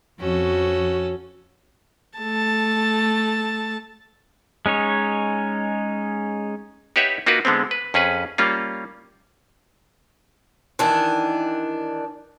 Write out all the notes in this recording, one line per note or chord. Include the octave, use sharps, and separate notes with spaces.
F2 C#4 F#4 A4
A3 A5
G#3 C#4 D#4 C#5
D#4 G4 B4 C#5 E5 F#5
A#3 D#4 F4 F#4 A#4 B4
D3 G#3 B3 C4
B4
F2 C#4 G#4 B4
G3 A#3 C#4 F4
D#3 E3 D4